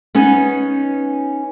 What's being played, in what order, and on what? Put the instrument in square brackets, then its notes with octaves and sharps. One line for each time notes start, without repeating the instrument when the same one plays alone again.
[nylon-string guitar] B3 C#4 D#4